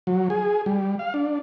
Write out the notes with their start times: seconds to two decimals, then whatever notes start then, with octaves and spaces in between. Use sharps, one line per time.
0.07 F#3
0.30 G#4
0.66 G3
0.99 F5
1.14 D4